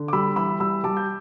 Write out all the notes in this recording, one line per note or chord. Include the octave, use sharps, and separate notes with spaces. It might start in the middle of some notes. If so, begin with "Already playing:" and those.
Already playing: D3
D6
G3 B5 E6
E3 B5 E6
G3 B5 E6
G3 A5 D6
G6